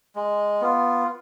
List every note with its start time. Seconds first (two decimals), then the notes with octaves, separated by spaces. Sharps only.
0.16 G#3
0.61 B3 F4